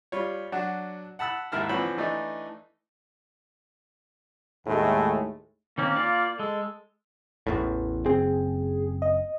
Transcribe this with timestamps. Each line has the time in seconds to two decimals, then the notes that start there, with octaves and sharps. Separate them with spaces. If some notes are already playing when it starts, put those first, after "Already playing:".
0.12 G3 F4 C#5
0.52 F#3 D4 F#4
1.19 F#5 A5 B5 E6 F#6
1.52 D#2 G#2 E4 A#4 A5 F6
1.69 D3 E3 F3 C4 C#5 B5
1.97 E3 A3 D4 D#4
4.67 D#2 A2 G#3 A3
5.78 D#3 A#3 C4 C#4
5.96 F4 D5
6.39 G#3 A4
7.47 A1 E2 A2
8.06 F#1 C4 G#4
9.02 D#5